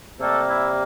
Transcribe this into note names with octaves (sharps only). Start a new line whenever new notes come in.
C3 G3 A3 A#3 A4
E4